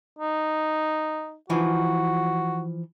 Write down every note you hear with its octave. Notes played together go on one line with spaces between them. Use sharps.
D#4
E3 F3 D#4 F#4